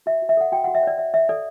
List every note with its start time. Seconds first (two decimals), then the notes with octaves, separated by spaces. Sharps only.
0.06 F#4 E5
0.22 F#4
0.29 E5
0.37 A4 F#5
0.52 F#4 G5
0.64 F#4 F#5
0.75 E5
0.83 C#5 D5
0.98 C#5 E5
1.13 C#5 E5
1.29 A4 D5